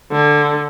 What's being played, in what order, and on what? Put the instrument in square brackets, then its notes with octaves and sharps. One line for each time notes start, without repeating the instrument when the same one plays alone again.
[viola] D3